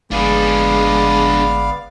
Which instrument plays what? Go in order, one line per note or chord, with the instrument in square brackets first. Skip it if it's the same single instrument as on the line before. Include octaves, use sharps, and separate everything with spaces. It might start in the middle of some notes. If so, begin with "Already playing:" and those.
[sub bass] G1 [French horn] G#3 [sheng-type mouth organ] B3 D5 F5 [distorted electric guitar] D4 G#4